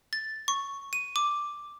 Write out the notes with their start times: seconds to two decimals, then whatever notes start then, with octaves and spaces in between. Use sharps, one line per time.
0.13 A6
0.48 C#6
0.93 D#7
1.16 D6